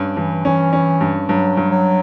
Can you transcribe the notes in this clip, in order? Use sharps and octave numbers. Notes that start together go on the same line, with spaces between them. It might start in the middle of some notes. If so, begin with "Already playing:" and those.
Already playing: G2 C#4
G2 E3
E3 C#4
C#4
G2
G2 F#3
G2
F#3